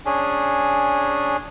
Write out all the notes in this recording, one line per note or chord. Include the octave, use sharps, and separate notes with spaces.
C#4 D4 G#4